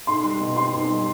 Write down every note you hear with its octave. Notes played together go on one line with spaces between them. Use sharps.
B1 C6
G3
B2
C4 C6
B1
G3